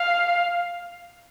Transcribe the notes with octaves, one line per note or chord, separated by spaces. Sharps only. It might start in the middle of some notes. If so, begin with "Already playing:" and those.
Already playing: F5